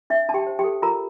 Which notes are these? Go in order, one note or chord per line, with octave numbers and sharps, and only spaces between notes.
D4 E5
D4 A5
G4 G5
C5
G4 G5
A4
F4 A#4 A#5